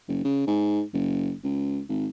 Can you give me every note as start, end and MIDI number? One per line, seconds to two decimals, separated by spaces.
0.08 0.24 30
0.25 0.44 49
0.47 0.83 44
0.93 1.33 30
1.44 1.81 37
1.89 2.07 32